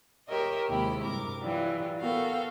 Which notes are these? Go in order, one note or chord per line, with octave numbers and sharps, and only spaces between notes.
G4 A#4 C#5 D#5 E5
D#2 C3 G#3 E4 G4 B5
G2 C3 A#4 D6
E3 F#3 G3 F4
B3 F#4 A4 A#4 F5 G5